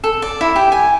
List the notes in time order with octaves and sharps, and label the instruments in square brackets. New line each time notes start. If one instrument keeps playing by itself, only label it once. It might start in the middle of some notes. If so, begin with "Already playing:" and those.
[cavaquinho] A4
D5
E4
G4
G#5